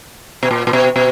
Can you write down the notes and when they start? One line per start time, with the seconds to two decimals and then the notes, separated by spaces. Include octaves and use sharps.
0.43 B2
0.51 A#2
0.67 A#2
0.73 B2
0.96 B2